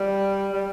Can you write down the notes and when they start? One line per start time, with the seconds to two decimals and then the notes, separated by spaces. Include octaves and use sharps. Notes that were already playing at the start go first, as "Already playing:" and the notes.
Already playing: G3
0.53 G3